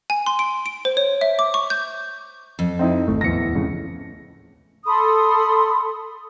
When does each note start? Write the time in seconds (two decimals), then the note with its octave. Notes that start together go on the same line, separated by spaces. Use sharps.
0.10 G#5
0.26 C6
0.39 D7
0.66 D7
0.85 C5
0.97 C#5
1.21 E5
1.39 D6
1.54 C#6
1.70 G6
2.59 F2
2.79 C4 D#4 E4
3.08 G#1 A3
3.21 D1 E2 E3 A#6 C#7
3.55 F2 A2 C#3
4.86 A4 B5 C6 D#6